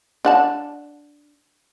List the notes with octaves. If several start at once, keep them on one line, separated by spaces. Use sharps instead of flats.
D4 F#5 A5